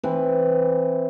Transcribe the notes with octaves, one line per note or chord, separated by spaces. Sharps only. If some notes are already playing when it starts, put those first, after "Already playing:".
E3 C4 B4